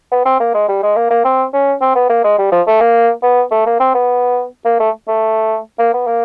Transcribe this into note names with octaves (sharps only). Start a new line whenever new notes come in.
B3
C4
A#3
G#3
G3
G#3
A#3
A#3
C4
C#4
C4
B3
A#3
G#3
G3
F3
A3
A#3
B3
A3
A#3
C4
B3
A#3
A3
A3
A#3
B3
A#3